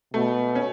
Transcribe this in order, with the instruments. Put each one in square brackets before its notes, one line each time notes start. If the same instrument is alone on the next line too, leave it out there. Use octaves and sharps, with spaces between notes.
[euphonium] B2 [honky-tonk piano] A3
[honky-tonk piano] C#4